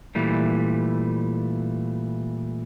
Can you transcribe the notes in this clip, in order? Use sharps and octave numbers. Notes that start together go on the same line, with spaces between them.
A#2 E3 G3 A3